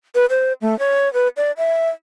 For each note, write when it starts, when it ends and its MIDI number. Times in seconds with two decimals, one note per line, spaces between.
0.15 0.25 71
0.30 0.53 72
0.62 0.77 57
0.79 1.12 73
1.13 1.28 71
1.37 1.51 74
1.57 1.89 76